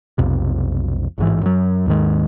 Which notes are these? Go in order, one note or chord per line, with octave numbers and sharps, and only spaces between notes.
B1 F2 C3
A1 G#2 E3
F#2 F#3
D#2 G#2 D#3 G#3